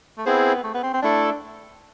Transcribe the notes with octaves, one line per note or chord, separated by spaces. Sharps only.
A3
B3 C4 E4 G#4 C5
A3
B3
C4
C4
A3 D4 E4 A4